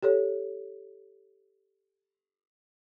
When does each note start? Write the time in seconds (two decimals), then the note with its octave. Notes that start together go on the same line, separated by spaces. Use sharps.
0.03 G4 A4 C#5